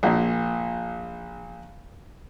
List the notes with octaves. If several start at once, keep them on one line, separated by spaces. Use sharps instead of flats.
A#1 A#2